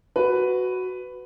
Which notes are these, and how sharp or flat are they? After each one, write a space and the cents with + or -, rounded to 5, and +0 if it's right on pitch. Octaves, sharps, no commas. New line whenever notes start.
F#4 +0 B4 +10